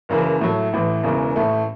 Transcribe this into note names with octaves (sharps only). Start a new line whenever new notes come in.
F#1 F#2 C#3 E3
A2 F#3 A3
A1 A2 E3
E1 E2 C#3 E3
A1 A2 A3